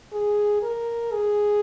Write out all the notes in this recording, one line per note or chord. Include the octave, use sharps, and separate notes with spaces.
G#4
A#4
G#4